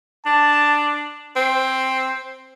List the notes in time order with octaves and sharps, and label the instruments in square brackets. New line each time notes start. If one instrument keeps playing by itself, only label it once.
[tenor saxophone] D4 [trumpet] A5
[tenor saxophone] C4